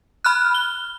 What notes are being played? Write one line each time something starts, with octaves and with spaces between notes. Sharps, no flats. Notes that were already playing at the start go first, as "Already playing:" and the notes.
B5 F6 F#6
G7